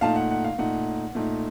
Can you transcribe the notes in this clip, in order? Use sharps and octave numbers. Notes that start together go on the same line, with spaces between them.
A#2 A3 D#4 F5 A5
F#5
F#5
F5
A#2 A3 D#4 F#5
A#2 A3 D#4